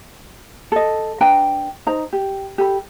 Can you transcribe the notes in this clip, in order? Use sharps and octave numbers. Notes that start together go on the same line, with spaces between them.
A4 D#5
D4 B4 G5 A#5
D#4 C5 A#5
G4
G4 A4 B5